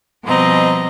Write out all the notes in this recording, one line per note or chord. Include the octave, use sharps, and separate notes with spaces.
B2 F3 G3 C4 D#5 A#5